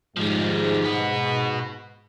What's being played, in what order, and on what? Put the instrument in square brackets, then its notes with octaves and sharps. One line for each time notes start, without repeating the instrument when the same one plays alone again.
[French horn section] G#2 [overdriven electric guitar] F3 G3
[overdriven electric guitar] F#4 B4